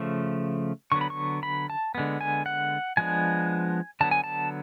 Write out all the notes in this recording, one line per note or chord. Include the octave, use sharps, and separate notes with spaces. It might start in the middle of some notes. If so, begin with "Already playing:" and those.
Already playing: C#3 F3 A3
D3 F#3 B3 C#6
B5
C#6
B5
A5
D3 G#3 B3
G#5
F#5
F3 G#3 B3 D4 G#5
D3 F#3 B3 A5
G#5
A5